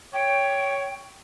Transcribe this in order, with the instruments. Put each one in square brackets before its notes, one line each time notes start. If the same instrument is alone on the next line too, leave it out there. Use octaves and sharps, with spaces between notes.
[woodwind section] C#5 [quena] G5